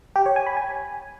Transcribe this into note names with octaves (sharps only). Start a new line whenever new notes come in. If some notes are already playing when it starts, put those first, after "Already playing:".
G4
C#5
G#5
B5
G#5